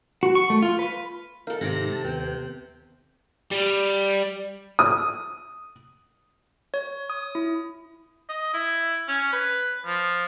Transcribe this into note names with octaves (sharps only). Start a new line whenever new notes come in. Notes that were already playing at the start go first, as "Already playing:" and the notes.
F#4
C#6
A3
F4
B4
D#4 A4 A#4 F5
G#2 C3 D#3 C6 D6 A#6
A5
D#2 C3 B3 G5
G3
D#6
C#5
D#6
E4
D#5
E4
C#4
B4
F3